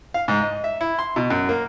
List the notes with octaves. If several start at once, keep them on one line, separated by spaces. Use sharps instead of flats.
F5
G#2
D#5
E5
E4
C6
B2
F#2
A#3